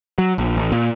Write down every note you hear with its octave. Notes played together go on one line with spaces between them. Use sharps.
F#3
A#1
A1
A#2